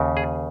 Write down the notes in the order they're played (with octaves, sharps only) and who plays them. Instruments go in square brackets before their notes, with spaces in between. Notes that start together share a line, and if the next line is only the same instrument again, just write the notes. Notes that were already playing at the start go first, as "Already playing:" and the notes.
Already playing: [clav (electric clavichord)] D#2 C#3
G#4